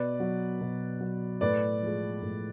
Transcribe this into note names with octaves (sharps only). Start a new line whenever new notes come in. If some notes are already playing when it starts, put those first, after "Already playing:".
Already playing: B2 B4 D5
F#3
B2
F#3
A2 B4 D5
F3 G#3
A2